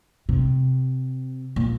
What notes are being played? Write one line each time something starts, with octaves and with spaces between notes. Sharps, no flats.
C3
A#2